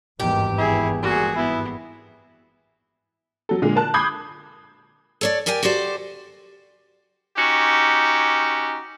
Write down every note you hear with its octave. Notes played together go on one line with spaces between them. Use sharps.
G#1 E2 G2 D#3 G4
E4 G#4
A#2 F#4 G#4
B3 E4
F#3 A4
A#2 D3 G#3
A#4 A5 F#6
B5 D6 D#6 G6 G#6 C7
A4 C#5 D5
G4 A#4 D5 G5 G#5
F#4 G4 A4 C5 D5
C#4 D#4 F#4 G4